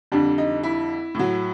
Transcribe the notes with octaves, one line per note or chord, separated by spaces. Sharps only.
F2 D3 G3 D4
D#4
E4
A2 F#3